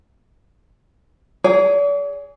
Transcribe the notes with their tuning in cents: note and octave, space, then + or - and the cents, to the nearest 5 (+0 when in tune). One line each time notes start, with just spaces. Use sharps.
G#4 +5 D5 -45